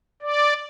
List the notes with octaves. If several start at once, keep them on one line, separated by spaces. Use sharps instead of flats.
D5